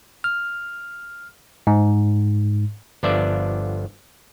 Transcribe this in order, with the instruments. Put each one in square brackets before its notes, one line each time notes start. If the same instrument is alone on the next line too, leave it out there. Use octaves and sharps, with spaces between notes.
[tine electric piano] F6
G#2
[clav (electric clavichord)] G1 F3 B3 D4 D5 E5